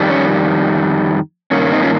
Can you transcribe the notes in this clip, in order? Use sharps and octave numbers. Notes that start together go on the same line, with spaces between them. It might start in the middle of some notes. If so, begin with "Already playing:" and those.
Already playing: F2 D#3 G3
C#4
G2 D#3 A#3 C#4
C#4
C4 D#4
C#4 F4